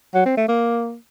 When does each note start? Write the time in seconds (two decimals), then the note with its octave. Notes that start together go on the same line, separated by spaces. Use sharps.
0.14 F#3
0.26 C4
0.37 A3
0.48 A#3